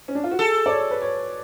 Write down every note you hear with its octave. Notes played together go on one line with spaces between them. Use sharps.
C#4
D4
F4
F#4
G#4 A4
D5
C#5
B4
C#5